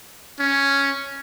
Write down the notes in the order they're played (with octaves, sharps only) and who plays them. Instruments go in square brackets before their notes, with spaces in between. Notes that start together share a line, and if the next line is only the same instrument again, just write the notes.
[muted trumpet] C#4